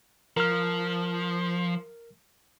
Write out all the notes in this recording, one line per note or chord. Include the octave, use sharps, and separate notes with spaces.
F3 A#4 F6